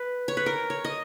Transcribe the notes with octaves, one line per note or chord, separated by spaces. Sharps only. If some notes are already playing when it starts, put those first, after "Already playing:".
Already playing: B4
C#5
B4
A#4
C#5
D#5